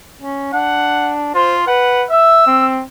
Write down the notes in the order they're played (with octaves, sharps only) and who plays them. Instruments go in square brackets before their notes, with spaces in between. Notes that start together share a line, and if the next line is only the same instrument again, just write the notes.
[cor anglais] C#4
[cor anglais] D4 [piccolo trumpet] F#5
[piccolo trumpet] F4 [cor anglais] C5
[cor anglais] B4 [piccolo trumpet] F#5
[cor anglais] E5 [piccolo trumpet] E6
[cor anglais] C4